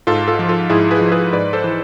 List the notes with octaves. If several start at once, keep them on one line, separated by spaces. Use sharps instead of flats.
G#2 F4 A4
F4 A4
F3
F4 A4
G#2 E4 G#4
G#4 B4
F3
G#4 B4
G#2 B4 D5
A4 C5
E3